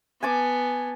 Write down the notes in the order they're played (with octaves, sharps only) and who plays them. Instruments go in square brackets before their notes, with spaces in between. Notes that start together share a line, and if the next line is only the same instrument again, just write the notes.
[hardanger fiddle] B3 [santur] G#5 A5 D6